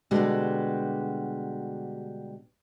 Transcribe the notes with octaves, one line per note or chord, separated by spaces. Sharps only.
B2 D3 G3 G#3 F#4 G4